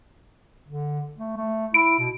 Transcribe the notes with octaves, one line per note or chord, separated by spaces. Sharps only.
D3
A3
A3
E4 D7
B2